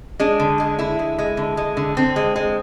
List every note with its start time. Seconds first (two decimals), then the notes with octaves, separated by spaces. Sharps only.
0.20 G#3 D4
0.40 D3
0.60 G#3
0.79 D3 E4
0.99 G#3
1.18 G#3
1.37 D3
1.57 G#3
1.77 D3
1.97 D3 C4
2.16 G#3
2.36 G#3